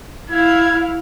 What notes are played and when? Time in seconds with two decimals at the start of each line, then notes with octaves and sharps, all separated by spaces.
0.30 E4 F5 G#6